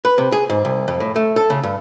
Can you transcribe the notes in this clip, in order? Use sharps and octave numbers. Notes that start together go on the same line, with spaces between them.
B4
C3
G#4
G#2
C2
F2
A2
A3
A4
C#3
G2